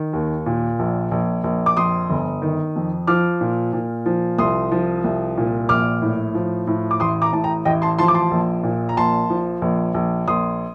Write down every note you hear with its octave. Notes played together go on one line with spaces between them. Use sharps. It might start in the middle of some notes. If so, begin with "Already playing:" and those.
Already playing: D#3
D#2
A#2
A#1
A#1
A#1
D6
F2 C6 D#6
G1
D#3
F2
F3 D6 F6
A#2
A#2
F3
C2 C6 D#6
F3
C2
A#2
A#1 D6 F6
A2
F3
A2
D6
A1 C6 D#6
A#5 D6
A2 A5
G5 A#5
A1 D#5 G5
A5 C6
F3 A5 C6
D6
A5 C6
A#1
A#2
A#5
A#1 A5 C6
F3
A#1
A#1
A#1 C6 D#6